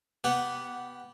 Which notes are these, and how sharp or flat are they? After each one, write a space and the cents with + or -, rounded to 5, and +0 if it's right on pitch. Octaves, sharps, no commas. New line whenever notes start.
B3 +0 G4 -15 F#5 -5